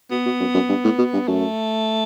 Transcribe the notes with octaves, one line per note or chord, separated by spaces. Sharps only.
B2 B3
B2
F#2
F#2
G2
A2
B2
G2
F#2 A3